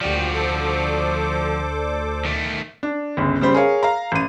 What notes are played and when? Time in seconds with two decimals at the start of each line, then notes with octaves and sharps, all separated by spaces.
0.01 D2 A#2 F3 F#4 G4 D5
0.32 A4 C5 D6
2.25 D#3 A3
2.83 D4
3.17 G1 C#2
3.41 C#3 G3 C5 B5
3.54 G#4 A#4 C#5 F5
3.83 F5 A#5
4.12 A1 D#7